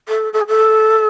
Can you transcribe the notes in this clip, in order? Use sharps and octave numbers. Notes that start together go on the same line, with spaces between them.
A4
A4
G#4
A4